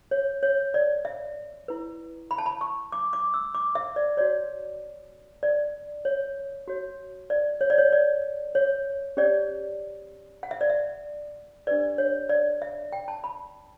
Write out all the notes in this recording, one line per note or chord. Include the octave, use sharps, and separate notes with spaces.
C#5
C#5
D5
E5
E4 B4
B5
A5
B5
C#6
D6
D6
E6
D6
E5
D5
F#4 C#5 D5
D5
C#5
F#4 C#5
D5
C#5
D5
C#5
D5
C#5
C#4 G4 C#5 D5
F#5
E5
D5
E5
D4 G4 B4 D5
C#5
D5
E5
G5
A5
B5